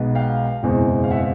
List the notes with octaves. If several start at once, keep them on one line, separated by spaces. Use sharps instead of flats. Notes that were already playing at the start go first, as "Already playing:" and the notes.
Already playing: B1 B2 G#3 B3
F5 G5
F#1 E2 B2 G#3 C4
F5
E5 F#5